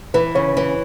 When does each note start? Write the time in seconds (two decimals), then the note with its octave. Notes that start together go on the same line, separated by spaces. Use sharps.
0.14 E3 B4
0.35 C#3 C#5
0.57 E3 C#5